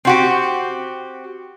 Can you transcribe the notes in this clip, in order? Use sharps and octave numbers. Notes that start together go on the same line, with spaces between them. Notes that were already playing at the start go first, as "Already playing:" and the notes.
C4 F#4 G4